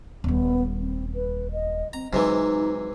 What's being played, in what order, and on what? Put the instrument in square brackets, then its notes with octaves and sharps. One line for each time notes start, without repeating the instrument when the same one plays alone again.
[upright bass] D#1 G3 [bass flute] B3
[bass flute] C4
B4
D#5
[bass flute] C4 [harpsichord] A#5
[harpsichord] G#2 C3 E3 [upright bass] F#3 [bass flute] D#4